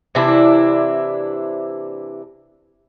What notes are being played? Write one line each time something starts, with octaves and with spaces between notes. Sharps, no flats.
C3 E3 D4 E4